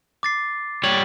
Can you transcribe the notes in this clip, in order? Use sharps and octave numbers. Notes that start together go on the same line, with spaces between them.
D6 A6 C7
G3 C#5 F#7